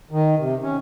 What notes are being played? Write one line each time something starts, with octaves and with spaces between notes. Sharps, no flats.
D#3
C3
C#4